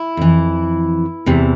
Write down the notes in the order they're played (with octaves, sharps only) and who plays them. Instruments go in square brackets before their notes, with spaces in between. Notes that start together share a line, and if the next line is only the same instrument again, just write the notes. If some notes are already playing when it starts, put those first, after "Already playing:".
Already playing: [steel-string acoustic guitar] E4
F2 E3
E2 C3 E3